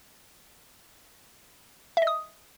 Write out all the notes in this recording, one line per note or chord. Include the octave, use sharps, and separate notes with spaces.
E5
D#5
D#6